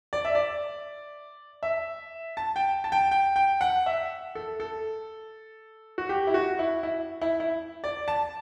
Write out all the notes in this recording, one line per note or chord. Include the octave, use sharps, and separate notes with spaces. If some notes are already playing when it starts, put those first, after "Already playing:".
D5
E5
D5
E5
A5
G5
A5
G5
G5
G5
F#5
E5
A4
A4
F#4
G4
E4
F#4
E4
E4
E4
E4
D5
A5